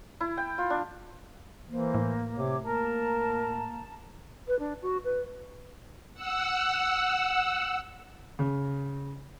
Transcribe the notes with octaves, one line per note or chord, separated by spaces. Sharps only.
E4
G5
F4
D4
E3 A#3 C5
A2
C3 C#5 D6
A#3 A#4 A5 A#5
B4
D4
F#4
B4
F#5 E6
C#3